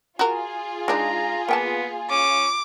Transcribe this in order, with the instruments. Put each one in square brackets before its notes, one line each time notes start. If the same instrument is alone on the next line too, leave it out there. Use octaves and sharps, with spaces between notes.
[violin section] F4 G#4 [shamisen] F#4 A#4
[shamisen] G#3 D4 D#4 [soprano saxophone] A#5
[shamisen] A#3 G5 A5 [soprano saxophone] B3
[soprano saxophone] C#4 [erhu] D6